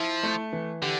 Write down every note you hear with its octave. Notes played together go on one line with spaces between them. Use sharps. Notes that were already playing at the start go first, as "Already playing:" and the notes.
Already playing: F3 E4
A3
E3
D3 G4